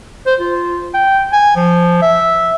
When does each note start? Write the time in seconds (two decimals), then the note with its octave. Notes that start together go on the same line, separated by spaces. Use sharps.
0.26 C5
0.40 F4
0.94 G5
1.33 G#5
1.56 F3
2.02 E5